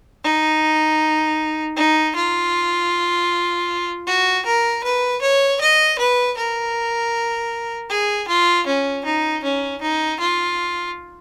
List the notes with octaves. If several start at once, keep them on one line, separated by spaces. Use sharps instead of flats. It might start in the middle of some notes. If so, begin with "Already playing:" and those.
D#4
D#4
F4
F#4
A#4
B4
C#5
D#5
B4
A#4
G#4
F4
C#4
D#4
C#4
D#4
F4